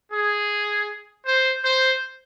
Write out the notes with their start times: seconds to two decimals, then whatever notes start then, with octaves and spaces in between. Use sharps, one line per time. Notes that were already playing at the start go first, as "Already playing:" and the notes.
0.12 G#4
1.25 C5
1.63 C5